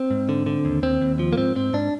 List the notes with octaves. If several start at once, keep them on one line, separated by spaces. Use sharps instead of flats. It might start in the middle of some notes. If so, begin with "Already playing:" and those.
Already playing: C4
G#2
D3
D3
D#2
D#2 C4
D#2
F3
A#3
G#2 C4
G#2 C4
G#2 D4